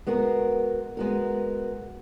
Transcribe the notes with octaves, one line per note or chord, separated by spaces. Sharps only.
G#3 B3 F#4 A#4
G#3 B3 F#4 A#4